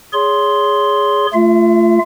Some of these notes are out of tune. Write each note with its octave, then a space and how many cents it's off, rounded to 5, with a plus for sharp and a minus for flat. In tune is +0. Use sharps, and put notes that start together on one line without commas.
G#4 -5 C#5 +25 C6 +0
A3 +0 F4 -15 E5 +40